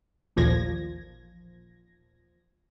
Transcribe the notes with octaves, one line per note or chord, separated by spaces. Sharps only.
A1 D#2 A#2 F3 G#6 A#6